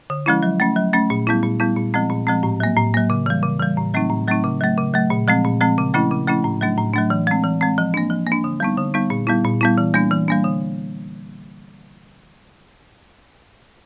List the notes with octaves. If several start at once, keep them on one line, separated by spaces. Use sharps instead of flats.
D3
F3 G#3 C#4 E4
F#3
A3 C#4
F#3
A3 C#4
A#2
G3 B3 E4
A#2
G3 B3 E4
A#2
F3 G#3 C4
A#2
F3 G#3 C4
A2
F#3 A#3
A2
F#3 A#3
C#3
E3 G3
C#3
E3 G3
A2
F#3 A3 C4 D#4
A2
F#3 A3 C4 D#4
C#3
F#3 A3
C#3
F#3 A3
A#2
F3 G#3 C4
A#2
F3 G#3 C4
C#3
F3 A3 C#4 E4
C#3
F3 A3 C#4 E4
A2
F#3 A3 D4
A2
F#3 A3 D4
E3
G#3 C4
E3
G#3 C4
F3
A#3 D4
F3
A#3 D4
D3
G3 B3 D#4
D3
G3 B3 D#4
A#2
G3 B3 E4
A#2
G3 B3 E4
E3
G3 A#3 D4
E3
G3 A#3 D4
D3